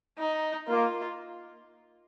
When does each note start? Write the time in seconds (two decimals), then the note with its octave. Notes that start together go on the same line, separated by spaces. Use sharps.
0.19 D#4
0.68 A#3 F4